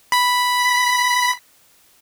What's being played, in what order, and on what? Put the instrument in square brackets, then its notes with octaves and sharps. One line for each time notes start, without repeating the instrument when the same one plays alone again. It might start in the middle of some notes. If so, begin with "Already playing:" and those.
[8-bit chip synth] B5 B6